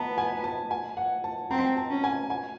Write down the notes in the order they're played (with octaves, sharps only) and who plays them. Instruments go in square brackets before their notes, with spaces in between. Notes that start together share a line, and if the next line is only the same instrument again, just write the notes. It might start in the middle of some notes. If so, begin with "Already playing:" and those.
Already playing: [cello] B3 [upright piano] A5 A#5
[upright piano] G#5
A5
G#5
F#5
A5
[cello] C4 [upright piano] A#5
[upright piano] A5
[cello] C#4
[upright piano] G#5
G#5